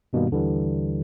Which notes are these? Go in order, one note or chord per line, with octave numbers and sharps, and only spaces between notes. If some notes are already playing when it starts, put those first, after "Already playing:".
G2 B2 D#3 G3 A#3
D#2 D3 E3 G3